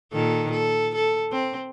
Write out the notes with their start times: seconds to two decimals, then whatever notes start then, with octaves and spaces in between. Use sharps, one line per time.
0.12 A#2 D#3 A4
0.51 A4
0.95 A4
1.32 C4